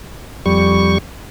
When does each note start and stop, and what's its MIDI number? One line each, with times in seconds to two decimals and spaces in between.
0.46 0.98 41
0.46 0.98 55
0.46 0.98 85